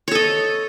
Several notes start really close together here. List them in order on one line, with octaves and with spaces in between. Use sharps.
C#5 A4 D#5